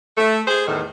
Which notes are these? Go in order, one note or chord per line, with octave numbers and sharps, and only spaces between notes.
A3
G#4 C5
E2 A2 D#3